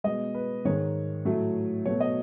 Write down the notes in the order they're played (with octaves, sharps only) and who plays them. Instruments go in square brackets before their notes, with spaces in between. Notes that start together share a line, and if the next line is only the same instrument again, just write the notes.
[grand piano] B2 G#3 D#5
B4
G#2 D#3 G#3 C#5
A2 F#3 A3
B2 F#3 A3 C#5
D#5